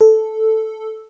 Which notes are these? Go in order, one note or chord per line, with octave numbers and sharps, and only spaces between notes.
A4